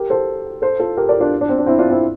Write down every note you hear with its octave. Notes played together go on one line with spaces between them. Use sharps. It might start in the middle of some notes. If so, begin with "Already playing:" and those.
Already playing: G4 A#4
A4 C5
A4 C5
F4 A4
G4 A#4
A#4 D5
D4 F4
D4
C4
D4
C4 E4
D4 F4
C4 E4